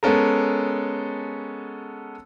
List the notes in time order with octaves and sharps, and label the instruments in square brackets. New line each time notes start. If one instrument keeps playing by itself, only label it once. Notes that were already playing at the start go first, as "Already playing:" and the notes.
[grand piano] G#3 B3 C#4 A4 A#4